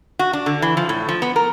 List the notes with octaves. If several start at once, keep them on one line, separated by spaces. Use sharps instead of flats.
F#4
D4
D3
E3
F3
A2
F3
B3
A#4